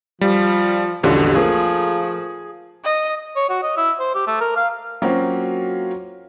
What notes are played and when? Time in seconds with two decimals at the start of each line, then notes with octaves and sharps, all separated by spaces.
0.21 F3 G3
1.03 A#1 E2 B2 D3 G3 C#4 F4
1.35 F3 A3 A#3 G#4
2.84 D#5
3.36 C#5
3.49 F#4
3.63 D#5
3.77 E4
4.00 C5
4.15 G4
4.27 A3
4.41 A#4
4.56 F5
5.02 F#3 A#3 C4 C#4 F4 F#4